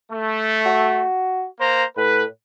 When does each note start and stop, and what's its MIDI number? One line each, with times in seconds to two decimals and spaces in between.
0.12 1.06 57
0.66 1.45 66
1.60 1.84 58
1.60 1.84 72
1.60 1.84 82
1.97 2.25 45
1.97 2.25 71